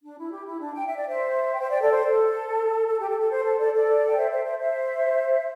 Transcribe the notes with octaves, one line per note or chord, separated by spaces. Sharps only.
D4
E4
G4
E4
D4
G5
E5
D5
C5 E5
G5
C5 E5
D5 G5
A4 D5
C5
A4
A4
G4
A4
A4
C5
A4
A4 D5
A4 D5
G5
C5 E5
C5 E5
C5 E5
C5 E5